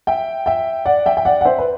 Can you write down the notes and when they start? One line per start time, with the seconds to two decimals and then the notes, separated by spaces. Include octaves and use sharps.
0.07 E5 G5
0.46 E5 G5
0.85 D5 F#5
1.06 E5 G5
1.17 G5
1.25 D5 F#5
1.41 F#5
1.45 C5 E5
1.59 B4